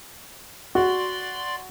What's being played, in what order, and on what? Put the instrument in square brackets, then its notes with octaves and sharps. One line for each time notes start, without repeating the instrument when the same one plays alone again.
[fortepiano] F#4 [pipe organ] D5 C6